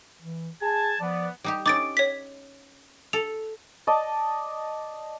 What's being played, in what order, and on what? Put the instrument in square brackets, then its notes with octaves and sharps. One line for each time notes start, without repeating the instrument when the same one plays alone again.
[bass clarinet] E3
[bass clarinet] G#4 [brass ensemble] A5 [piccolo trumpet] G#6
[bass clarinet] F3 [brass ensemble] B3 [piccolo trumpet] D5
[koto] G3 D#4 G4
[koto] C#4 D#4 [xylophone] D6 A6 D7
[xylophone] C#5 B6
[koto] A4 [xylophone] F7
[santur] D5 D#5 A5